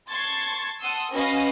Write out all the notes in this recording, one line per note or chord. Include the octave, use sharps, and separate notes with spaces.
A5 C6 C#6 G#6 A6
F#5 A5 C6 D#6 E6
C#4 F#4 B4 D#5 F5 A#6